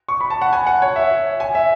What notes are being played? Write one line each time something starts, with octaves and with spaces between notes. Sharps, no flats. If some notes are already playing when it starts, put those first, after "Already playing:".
C#6
B5
A5
F#5
G#5
F#5
C#5
E5
G#5
E5